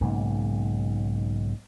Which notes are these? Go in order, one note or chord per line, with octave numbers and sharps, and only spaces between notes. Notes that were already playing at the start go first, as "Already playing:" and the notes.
B1 G#2 C#3 A#3